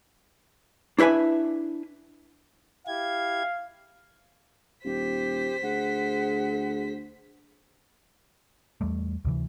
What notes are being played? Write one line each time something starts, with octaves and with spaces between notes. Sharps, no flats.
D4 E4 B4 E5 G#5
E4 G4 F5 G#6
D#1 G4 C5 B6
D2 G#4 F#5
E2 G3 A3
D2 C3 E3